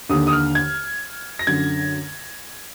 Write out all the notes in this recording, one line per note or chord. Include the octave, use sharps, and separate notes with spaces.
D#2 D3 D#6
D#6
F6
G#6
A#6
F#2 D3 G#6